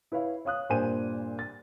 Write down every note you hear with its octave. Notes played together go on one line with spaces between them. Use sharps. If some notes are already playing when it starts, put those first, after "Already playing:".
E4 B4 C#5 F5
C#5 F5 D#6 F#6
G2 A#2 C5 G#5 D#7
A6